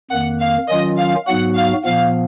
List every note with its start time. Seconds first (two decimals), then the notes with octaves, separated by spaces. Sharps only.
0.10 F2 D#3 A#3 F#5
0.40 F5
0.68 D#3 F#3 C#4 F4 D#5
0.97 F5
1.27 G#2 F#3 B3 F#4 F#5
1.55 F5
1.84 A#2 F3 B3 F5